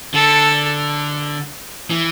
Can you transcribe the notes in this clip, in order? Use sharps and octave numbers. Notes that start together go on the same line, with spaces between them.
D3 A4
E3